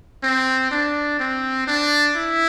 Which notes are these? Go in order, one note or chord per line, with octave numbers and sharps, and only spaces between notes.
C4
D4
C4
D4
E4